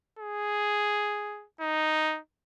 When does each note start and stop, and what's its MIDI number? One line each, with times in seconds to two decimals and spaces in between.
0.19 1.46 68
1.61 2.19 63